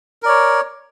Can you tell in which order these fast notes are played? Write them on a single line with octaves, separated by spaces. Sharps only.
A#4 D5 C#5